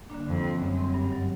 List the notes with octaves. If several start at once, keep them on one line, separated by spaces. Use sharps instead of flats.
D3 G3 A#3 D4
F2 D3
G3 C4
F#2 D3
G3 C4
G2
D#3 F#3